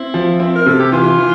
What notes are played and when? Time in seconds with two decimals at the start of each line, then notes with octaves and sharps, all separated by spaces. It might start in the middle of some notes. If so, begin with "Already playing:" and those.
Already playing: C4 E4
0.14 F3
0.40 C4
0.55 A#4
0.66 C3 A4
0.79 G4
0.92 E3 F4
1.18 E3